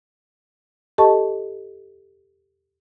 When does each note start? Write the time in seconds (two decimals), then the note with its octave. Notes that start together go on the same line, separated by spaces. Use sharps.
0.98 G4 A4 D#5 A5 C#6